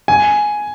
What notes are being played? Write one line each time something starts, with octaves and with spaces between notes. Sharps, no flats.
G#5